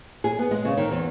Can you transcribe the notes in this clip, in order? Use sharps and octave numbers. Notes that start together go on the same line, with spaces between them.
G#4
B3
G#3
C#3
D#3
E2